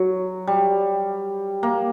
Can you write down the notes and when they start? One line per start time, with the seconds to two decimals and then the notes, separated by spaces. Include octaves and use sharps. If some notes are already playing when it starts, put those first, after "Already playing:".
Already playing: F#3
0.47 G3
1.63 A#3